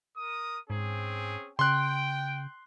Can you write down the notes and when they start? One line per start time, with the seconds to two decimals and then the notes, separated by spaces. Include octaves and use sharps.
0.18 A#4 D#6
0.70 G#2 C4 C#4 G#4
1.59 C#3 G5 C6 F#6